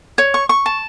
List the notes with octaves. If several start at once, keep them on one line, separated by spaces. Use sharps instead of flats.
C#5
C#6
C#6
A5